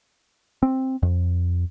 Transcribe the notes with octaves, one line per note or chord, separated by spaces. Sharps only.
C4
F2